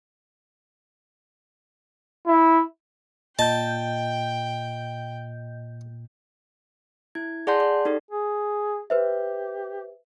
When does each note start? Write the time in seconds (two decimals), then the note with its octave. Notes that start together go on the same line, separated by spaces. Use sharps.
2.27 E4
3.39 A#2 D#5 G5 A5 G6
7.15 E4 G#6
7.47 G#4 D5 F#5 A5 C6 G6
7.60 D5
7.85 D#4 G4 A4
8.11 G#4
8.90 G4 B4 C5 E5